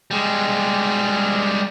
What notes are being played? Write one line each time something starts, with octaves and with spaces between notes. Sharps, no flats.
G3 G#3